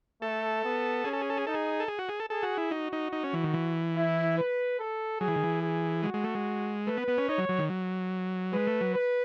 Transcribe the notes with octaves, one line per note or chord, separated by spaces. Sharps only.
A3 A4
B3
C#4 G#4
A4
G#4
A4
G#4
D#4 A4
G#4
A4
G#4
F#4
G#4
A4
G#4 A4
F#4
E4
D#4 F#4
D#4
D#4
C#4
E3
D#3
E3
E4
B4
A4
F#3 G#4
E3
D#3
E3
G#4
G#3 F#4
G#3
A3
G#3
A3 B4
B3
B3
C#4
D#4 C#5
F#3
F#3
D#3
F#3
G#3 B4
A3
F#3
B4